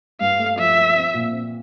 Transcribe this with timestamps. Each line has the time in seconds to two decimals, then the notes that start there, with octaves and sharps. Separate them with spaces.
0.21 G2 F5
0.39 A3
0.58 F3 E5
0.77 F3
0.96 C4
1.14 A#2
1.33 C4